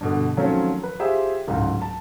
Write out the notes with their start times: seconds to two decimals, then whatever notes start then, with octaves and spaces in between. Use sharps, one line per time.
0.01 G2 B2 D3
0.37 D#3 F3 F#3 A3 C4 C#4
0.84 B4
0.99 F4 G4 G#4 C5 E5
1.47 D1 C#2 G#2 F4
1.82 A5